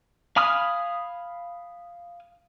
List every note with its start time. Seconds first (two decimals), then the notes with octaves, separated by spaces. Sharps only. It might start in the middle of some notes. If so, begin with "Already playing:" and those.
0.36 F5 G#5 B5 D#6 F6